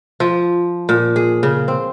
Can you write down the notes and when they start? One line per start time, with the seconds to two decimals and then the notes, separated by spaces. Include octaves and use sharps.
0.20 F3
0.89 A#2
1.16 G#4
1.43 C#3
1.68 C4